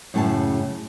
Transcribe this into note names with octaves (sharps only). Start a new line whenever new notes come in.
F#2 A2 C#3 A4 A5